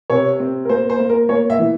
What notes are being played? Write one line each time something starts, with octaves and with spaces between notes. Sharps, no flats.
C3 C#5
C4
A#4
A#3 C5
C5
A#3
A#4
A#3 C#5
E5
E3